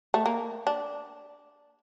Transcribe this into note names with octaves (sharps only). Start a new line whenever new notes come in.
A3
A#3
D4